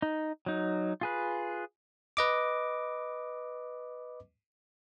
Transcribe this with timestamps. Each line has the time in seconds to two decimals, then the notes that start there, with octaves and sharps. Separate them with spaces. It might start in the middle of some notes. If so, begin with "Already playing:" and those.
0.02 D#4
0.46 F#3 D#4
1.01 F4 G#4 B4
2.17 B4 D#5 D6